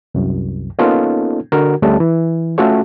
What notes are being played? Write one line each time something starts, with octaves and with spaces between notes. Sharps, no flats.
C2 F#2
A#3 B3 C#4 D#4 F4 A4
D3 F#4 A#4
D2 G3 A3 C#4 A5
E3
A3 C#4 F4 F#4 A4 C#5